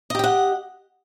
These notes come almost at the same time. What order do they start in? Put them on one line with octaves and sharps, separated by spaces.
D#5 G4 G5 F#5